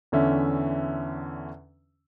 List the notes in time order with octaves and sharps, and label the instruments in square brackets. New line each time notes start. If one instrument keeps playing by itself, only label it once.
[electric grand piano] E2 D3 C#4 E5